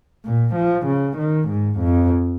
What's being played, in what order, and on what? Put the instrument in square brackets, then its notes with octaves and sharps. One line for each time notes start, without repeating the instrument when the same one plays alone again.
[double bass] A#2
F3
C#3
D#3
G#2
F2